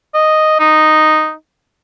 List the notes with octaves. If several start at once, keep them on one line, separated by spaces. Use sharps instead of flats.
D#5
D#4